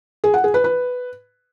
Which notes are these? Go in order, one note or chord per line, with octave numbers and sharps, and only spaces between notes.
G#4
F#5
G#4
B4
B4